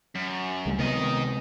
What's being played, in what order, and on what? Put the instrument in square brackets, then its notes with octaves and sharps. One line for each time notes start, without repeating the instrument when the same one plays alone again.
[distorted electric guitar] F#2
[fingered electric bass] C#2 G3 A3
[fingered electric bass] C3 G#3 B3 [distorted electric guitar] D#3 D#5